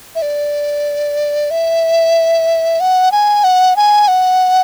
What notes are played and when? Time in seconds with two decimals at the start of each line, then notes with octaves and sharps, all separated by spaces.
0.15 E5
0.22 D5
1.51 E5
2.80 F#5
3.12 G#5
3.44 F#5
3.76 G#5
4.08 F#5